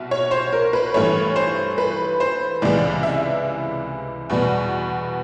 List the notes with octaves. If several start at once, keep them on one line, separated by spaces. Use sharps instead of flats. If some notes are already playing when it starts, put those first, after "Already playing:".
Already playing: C2 B2
C#5
C5
A#4
B4
G2 E3 A3 C#5
C5
B4
C5
C#2 C3 E3 G#3 D5
E5
E2 B2 G3 B3